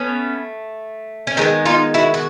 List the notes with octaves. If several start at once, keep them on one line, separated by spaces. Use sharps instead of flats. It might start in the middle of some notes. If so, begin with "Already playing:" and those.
Already playing: A3 B3 C#4
C#4
D#3 G#3 B3 C4
D#4 F4
E4 F#4
F#4